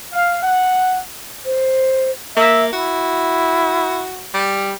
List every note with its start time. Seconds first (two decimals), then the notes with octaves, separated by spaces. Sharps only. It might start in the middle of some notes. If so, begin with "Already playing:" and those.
0.13 F5
0.43 F#5
1.46 C5
2.36 A#3 E5
2.73 E4 F#4
4.34 G3